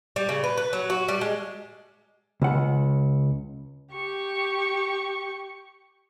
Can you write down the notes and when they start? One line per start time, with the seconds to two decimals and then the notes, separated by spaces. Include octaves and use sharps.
0.16 G3
0.29 C#3
0.44 B4
0.58 B4
0.73 F#3
0.90 F#4
1.08 G3
1.21 G#3
2.42 C#2 F#5
3.94 G4 C#6